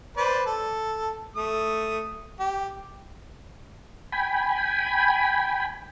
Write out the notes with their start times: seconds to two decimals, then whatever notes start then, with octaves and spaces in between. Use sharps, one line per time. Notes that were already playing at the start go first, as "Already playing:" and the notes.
0.17 B4 C5 D5
0.46 A4
1.36 A3 D#6
2.40 G4
4.12 G5 G#5 B5